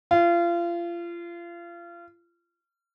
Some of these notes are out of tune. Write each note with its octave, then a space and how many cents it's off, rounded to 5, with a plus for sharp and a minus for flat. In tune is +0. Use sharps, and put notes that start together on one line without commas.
F4 -30